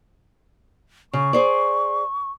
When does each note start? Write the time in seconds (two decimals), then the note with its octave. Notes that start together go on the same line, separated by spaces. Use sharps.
1.13 C#3 C#6
1.33 G#4 C5 D5